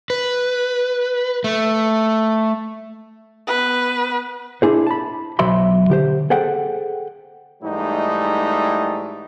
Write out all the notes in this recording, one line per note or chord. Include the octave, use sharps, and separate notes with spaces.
B4
A3
B3 B4
D4 E4 G#4 C5
A5 B5
B1 F#3 C5 E5 B5 C6
D3 G4 C5
G#4 A4 C5 F#5 G5
G#2 E3 G3 A3 D#4